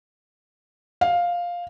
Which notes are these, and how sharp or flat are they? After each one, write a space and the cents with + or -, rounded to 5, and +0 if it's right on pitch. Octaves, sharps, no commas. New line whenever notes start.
F5 +5